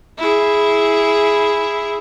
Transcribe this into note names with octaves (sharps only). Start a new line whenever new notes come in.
E4 G#4